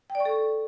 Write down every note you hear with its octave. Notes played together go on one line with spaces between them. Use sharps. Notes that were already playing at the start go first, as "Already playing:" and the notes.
G5
D5
C#6
A4